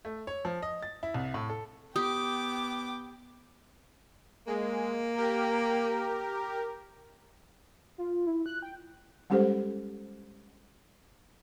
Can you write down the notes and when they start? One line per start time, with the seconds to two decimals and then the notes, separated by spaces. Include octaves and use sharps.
0.05 A3
0.27 C#5
0.45 F3
0.62 D#5
0.83 A6
1.03 E4
1.14 C2
1.34 A2
1.50 A4
1.96 B3 G4 G5 D6 D#6
4.47 G#3 A#3
5.15 G4 A#4
7.98 F4
8.27 E4
8.46 F#6
8.62 G5
9.30 G3 G#3 C#4 G4 A4 C5